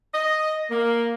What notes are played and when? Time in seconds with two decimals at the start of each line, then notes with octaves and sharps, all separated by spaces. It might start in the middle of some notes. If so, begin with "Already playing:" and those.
0.14 D#5
0.71 A#3